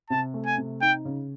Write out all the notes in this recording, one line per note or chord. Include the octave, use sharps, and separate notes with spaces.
C3 A5
A3
G#5
C3
D#4 G5
C#3